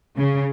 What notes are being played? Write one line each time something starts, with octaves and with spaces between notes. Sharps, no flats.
C#3